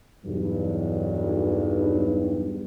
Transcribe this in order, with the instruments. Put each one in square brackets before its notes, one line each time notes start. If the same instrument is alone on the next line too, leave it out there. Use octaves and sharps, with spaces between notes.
[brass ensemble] B1 E2 G2